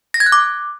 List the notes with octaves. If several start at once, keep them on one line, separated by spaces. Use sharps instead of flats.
A#6
G#6
F#6
D6